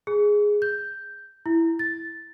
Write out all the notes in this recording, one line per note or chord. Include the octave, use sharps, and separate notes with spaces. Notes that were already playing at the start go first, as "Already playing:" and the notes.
G#4
G6
E4
A6